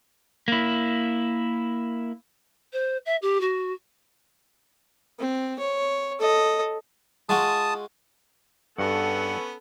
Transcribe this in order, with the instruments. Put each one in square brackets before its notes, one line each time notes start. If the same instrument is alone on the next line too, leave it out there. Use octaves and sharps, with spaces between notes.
[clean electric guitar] A#3 E4
[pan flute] C5
E5
G4
F#4
[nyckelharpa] C4
C#5
A4 D#5
[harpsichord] G#3 F4 F#4 [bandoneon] A5 D#6
[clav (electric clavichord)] G2 F#4 [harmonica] B3 C#4 [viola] A4 [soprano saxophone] F#5